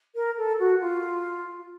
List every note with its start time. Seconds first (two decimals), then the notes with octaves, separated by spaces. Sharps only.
0.15 A#4
0.37 A4
0.59 F#4
0.80 F4